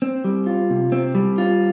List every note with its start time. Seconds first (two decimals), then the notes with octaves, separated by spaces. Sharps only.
0.02 C4
0.24 G3
0.47 F4
0.70 C3
0.92 C4
1.15 G3
1.38 F4